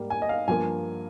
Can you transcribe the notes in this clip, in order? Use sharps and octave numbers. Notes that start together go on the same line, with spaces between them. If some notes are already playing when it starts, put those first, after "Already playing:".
Already playing: G#2 G3 A#3
G#5
D#5
F5
G2 F3 A#3 G#5